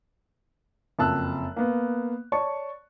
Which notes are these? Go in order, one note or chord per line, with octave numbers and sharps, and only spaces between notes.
F#1 F2 A5 E6 F#6
A#3 B3
C#5 D5 A5 C#6